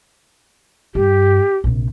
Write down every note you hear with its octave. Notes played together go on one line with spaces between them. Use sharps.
G2 G4
A#1 C3